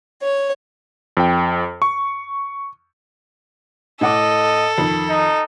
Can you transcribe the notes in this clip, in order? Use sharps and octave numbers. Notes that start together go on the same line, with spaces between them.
C#5
F2 G5
C#6
A2 A4 D#5 F#5 D6
F2 D#3
D#4